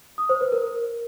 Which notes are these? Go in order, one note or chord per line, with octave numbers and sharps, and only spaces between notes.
D#6
C5
B4
A#4